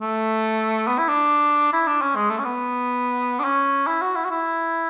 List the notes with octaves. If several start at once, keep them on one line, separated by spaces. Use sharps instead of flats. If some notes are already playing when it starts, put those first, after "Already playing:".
A3
B3
E4
D4
E4
D4
C#4
G#3
A3
C#4
B3
D4
C#4
E4
F#4
E4
F#4
E4